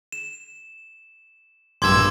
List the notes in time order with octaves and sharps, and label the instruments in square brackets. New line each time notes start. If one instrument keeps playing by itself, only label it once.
[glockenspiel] E7
[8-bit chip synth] A#1 G2 E6 [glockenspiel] C6 D6 G#6